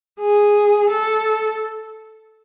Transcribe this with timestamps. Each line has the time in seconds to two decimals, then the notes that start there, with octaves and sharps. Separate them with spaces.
0.20 G#4
0.89 A4